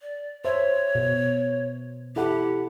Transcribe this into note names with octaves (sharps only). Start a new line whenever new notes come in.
D5
C5 C#5 E5
B2
E4 G4 A4 F#5